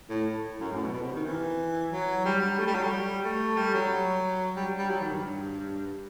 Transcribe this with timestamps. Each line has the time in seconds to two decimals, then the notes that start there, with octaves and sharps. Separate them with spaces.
0.09 A2
0.60 F#2
0.71 A2
0.82 B2
0.93 B2
1.03 C3
1.14 D#3
1.26 E3
1.91 F#3
2.26 G3
2.41 G3
2.58 A3
2.67 G3
2.75 F#3
2.83 G3
3.24 A3
3.57 G3
3.74 F#3
4.56 G3
4.79 G3
4.90 F#3
5.01 D#3
5.12 G2